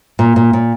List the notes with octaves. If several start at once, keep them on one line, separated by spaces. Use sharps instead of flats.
A#2
A#2
A#2